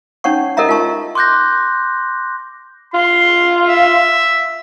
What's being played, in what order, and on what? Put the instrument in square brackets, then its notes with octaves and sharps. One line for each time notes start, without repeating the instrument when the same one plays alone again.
[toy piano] C#4 D#4 C#5 F#5 C#6
A4 A#4 D#5 E5 A#5
F4 A#4 A5 C#6
[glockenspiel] C6 D6 F#6 G6 A#6
[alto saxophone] F4 [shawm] C6
[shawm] E5